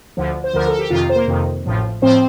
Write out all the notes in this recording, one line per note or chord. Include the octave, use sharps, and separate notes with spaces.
D2 D3 F3
C5
D2 D3 F3 A#4
A4
G4
F2 C3 D#3 F4
C5
A#3 A#4
F2 C3 D#3
A1 A2 F3
A2 F3 C4 C5